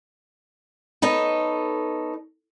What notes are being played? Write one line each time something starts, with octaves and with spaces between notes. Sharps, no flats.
B3 D#4 A4 C#5